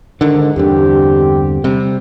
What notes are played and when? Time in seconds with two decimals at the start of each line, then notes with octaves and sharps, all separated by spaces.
0.21 G#2 D3 D#3
0.56 E2 G2 D3 C4 G4
1.64 C3 G3